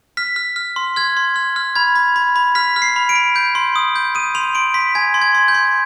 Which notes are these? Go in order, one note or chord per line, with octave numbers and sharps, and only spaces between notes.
F6 B6
F6
F6
C6
F6 G#6
C6
F6
F6
B5 G#6
B5
B5
B5
F6 B6
F6
C7
B5
D7
B5
G6
C6
D#6
G6
D#6 D#7
C6 F7
C6 D7
C6 B6
G#5 G#6
C6
G#6
C6
G6
C6